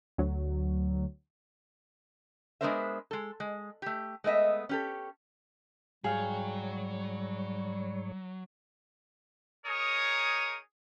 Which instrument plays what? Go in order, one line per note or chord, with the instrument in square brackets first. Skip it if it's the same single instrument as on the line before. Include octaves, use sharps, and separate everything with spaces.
[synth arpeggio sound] D2 F#3
[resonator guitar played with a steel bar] G#3 B3 D4 A#4 C5 E5
G#3 A4
G#3
A3 G4
G#3 A3 B3 D#5 E5
C#4 G4 A4
[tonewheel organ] G#2 C#5 [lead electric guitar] F#3 [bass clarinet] G3 [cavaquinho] G#4 F5 G5
[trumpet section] D#4 G#4 A#4 C#5 D#6